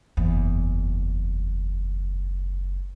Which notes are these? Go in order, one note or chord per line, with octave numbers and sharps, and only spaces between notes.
F#1 E2